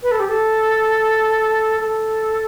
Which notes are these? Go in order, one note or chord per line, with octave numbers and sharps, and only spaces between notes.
B4
A4
G4
A4
A4